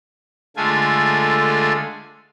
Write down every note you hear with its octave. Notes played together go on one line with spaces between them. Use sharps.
D3 G#3 A3 F4 A4 G#5